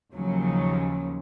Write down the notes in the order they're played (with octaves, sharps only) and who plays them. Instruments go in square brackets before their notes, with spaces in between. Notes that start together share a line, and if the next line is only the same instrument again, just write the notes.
[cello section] D#2 C#3 F3 F#3